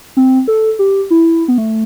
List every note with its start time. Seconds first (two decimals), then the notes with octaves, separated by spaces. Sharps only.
0.17 C4
0.48 A4
0.79 G4
1.11 E4
1.48 B3
1.58 A3